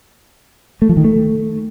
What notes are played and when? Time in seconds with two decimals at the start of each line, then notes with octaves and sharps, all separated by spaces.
0.82 A3
0.89 F3
0.97 D#3
1.04 A3